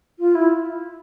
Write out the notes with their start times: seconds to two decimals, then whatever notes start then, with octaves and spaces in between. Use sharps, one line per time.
0.19 F4
0.34 E4